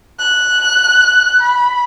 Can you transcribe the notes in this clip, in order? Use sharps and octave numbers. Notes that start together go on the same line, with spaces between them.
F#6
B5